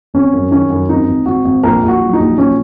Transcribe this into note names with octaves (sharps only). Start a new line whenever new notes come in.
G#1 C#4
F#2
D#3 C#4
F#2
G#1 D#4
G#1
G#1 F#4
G#1
A#1 A#4
A#1
F#4
F#3
D#4
A#1
A#1 C#4